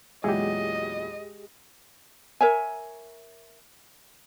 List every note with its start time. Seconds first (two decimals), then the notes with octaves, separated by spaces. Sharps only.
0.24 E2 A#2 F#3 G#3 G4 G#4 D#5
2.41 A#4 C#5 E5 G#5